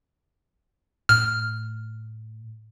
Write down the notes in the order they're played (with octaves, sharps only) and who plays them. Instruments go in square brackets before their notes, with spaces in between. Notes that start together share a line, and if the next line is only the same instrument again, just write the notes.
[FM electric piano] A2 [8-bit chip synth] F6